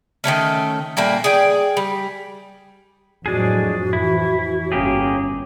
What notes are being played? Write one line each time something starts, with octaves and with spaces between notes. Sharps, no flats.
D#3 G3 A3 C#4
A#2 G3 A3 A#3
G#4 D5 G5
G3
F2 A2 F#3 G#3 D4 F#4 G#4
F2 E3 E4
G1 A#3 C#4 G4 G#4